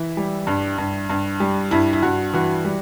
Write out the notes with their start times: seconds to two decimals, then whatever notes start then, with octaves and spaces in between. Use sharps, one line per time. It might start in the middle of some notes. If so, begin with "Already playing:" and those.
Already playing: E3 E4
0.17 G3
0.47 G2
0.78 G2
1.10 G2
1.40 G3
1.71 G2 E4
1.93 E4
2.02 G2 F#4
2.33 E3 F#4
2.65 G3